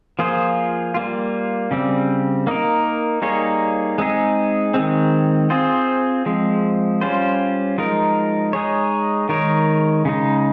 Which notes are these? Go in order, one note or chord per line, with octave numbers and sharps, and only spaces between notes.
F3 A#3 F4 G#4 C5
G3 A#3 F4
C#3 G3 C4
A#3 D#4 A#4
G3 A#3 D#4 G#4 C#5
G#3 C4 D#4 G#4
D#3 G#3 C4
C4 F4 G#4 C5
F3 G#3 C4
G3 C#4 F4 C5
F3 G#3 D#4 A#4
G#3 D#4 G#4 C#5
D#3 G#3 D#4 A#4 C#5
C#3 G#3 D#4